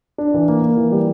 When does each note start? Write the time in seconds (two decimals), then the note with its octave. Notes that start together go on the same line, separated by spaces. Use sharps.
0.18 D4
0.34 E3
0.48 A#3
0.62 A#3
0.77 E3
0.92 G3